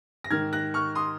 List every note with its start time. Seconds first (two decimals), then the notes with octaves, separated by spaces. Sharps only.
0.24 A#6
0.30 G#2 D#3 F6 G#6
0.53 F#6 A#6
0.74 C#6 F6
0.95 C6 D#6